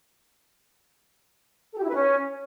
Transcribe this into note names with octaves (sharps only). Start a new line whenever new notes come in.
A4
G4
E4
B4
C#4